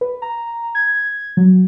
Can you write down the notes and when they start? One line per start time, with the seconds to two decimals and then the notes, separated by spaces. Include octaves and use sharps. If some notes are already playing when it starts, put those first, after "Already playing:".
0.01 B4
0.22 A#5
0.75 G#6
1.37 F#3